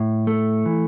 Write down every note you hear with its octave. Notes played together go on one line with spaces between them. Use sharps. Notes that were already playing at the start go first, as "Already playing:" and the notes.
Already playing: A2
A3
E3